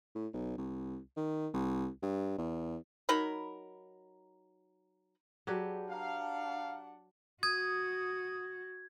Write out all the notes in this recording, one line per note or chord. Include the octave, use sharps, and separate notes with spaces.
A2
B1
C2
D#3
C2
G2
E2
F#3 D#4 A#4 B5
F#3 G4 G#4 B4 D5 A5
D4 F5 F#5 A5 A#5
F#4 D#6 G#6